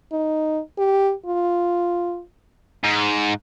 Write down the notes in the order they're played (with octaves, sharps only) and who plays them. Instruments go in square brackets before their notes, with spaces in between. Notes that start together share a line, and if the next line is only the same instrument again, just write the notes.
[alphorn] D#4
G4
F4
[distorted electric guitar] G#2